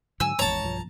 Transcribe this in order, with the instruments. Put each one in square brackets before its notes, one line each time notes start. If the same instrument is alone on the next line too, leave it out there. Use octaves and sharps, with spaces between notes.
[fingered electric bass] G#2 D3 F#3 [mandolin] G#5 E6
[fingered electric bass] G#1 E2 G#2 [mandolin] C#5 [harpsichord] A5 A#5
[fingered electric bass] B1 G2 F3